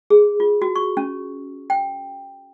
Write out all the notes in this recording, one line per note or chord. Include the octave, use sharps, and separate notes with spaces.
G#4
F4
F#4
C#6
C#4
G5